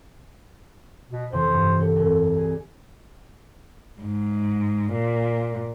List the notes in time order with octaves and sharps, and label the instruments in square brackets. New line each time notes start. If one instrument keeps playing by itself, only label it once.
[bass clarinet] B2
[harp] F2 C3 E3 [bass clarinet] C5
[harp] G2
G4 A4 C#5
[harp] C2 [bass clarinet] F2
[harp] G#4
[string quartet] G#2
A#2